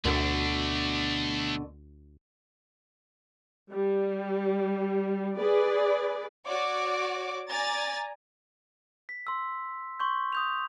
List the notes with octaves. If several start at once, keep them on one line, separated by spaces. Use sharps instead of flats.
D2 B2 D3 A3 D4
G3
G#4 B4 D5
F#4 C#5 D5 D6
D5 G#5 A#5 A6
B6
C6 E6
C6 C#6 G6
D#6 G6 F7